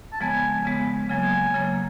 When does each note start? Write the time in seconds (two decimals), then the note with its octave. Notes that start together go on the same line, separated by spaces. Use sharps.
0.13 A5
0.20 C#3 F3 G#3 B3 G#5
0.65 C#3 F3 G#3 B3
1.09 C#3 F#3 A#3 G#5
1.54 C#3 F#3 A#3